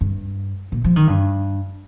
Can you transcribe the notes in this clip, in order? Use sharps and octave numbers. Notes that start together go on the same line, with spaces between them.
G2
A#2
F3
D#3
G2